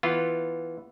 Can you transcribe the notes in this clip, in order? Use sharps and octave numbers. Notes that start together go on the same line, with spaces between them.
E3 B3 F4